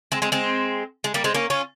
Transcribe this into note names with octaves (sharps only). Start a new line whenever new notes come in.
G#3 C4
G#3 C4
G#3 C4
G#3
G3 A#3
G#3 C4
A#3 C#4
C#4 F4